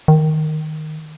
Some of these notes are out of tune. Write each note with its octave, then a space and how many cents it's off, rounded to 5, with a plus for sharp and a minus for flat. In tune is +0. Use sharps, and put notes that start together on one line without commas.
D#3 -5